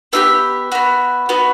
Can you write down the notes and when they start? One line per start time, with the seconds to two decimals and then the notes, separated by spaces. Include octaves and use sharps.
0.13 B3 D4 G4 E5
0.72 B3 F#4
1.29 B3 F#4